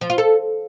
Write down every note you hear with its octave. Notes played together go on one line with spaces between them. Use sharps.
F3
F4
A4